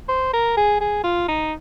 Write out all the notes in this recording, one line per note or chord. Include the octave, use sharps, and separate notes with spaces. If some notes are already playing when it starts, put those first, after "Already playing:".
C5
A#4
G#4
G#4
F4
D#4